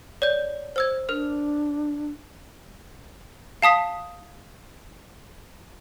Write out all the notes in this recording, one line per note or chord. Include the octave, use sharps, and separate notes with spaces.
C#5 D5 G6
C5 E6 G#6
D4 A#4 F6
F5 A5 D#6 B6